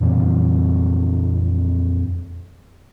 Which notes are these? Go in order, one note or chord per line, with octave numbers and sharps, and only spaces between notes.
F2 A#2 E3 C4